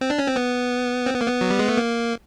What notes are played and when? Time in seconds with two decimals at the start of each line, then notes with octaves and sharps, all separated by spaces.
0.01 C4
0.10 D4
0.19 C#4
0.27 C4
0.36 B3
1.06 C4
1.14 B3
1.21 A#3
1.28 B3
1.41 F#3
1.50 G3
1.59 G#3
1.68 A3
1.77 A#3